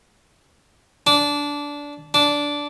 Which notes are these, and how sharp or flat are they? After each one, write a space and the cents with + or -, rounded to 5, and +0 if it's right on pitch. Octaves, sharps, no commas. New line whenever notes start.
D4 -15
D4 -10